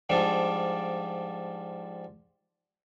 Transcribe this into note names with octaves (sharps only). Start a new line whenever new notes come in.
G#2 F3 G3 D4